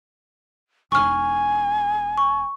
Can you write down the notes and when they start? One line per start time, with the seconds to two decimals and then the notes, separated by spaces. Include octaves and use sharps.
0.92 E1 D#4 G#5 C#6 F6
2.18 C#6